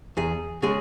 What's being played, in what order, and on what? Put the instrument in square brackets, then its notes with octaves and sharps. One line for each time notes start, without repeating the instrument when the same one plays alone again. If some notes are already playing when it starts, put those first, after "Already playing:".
[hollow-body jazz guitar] E2 G#4
C#3 G#3 G#4